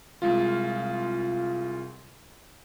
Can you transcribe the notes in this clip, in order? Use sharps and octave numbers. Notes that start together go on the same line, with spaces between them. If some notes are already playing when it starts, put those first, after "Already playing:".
C2 G#3 F4